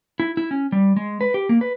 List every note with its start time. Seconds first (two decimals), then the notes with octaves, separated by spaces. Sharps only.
0.20 E4
0.37 E4
0.51 C#4
0.72 G3
0.96 G#3
1.21 B4
1.34 G4
1.49 A#3
1.61 B4